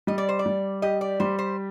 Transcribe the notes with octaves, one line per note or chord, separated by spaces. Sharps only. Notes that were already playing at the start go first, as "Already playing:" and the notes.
G3 D#5
D5
C5
D5
G3
G4 D#5
D5
G3 C5
C5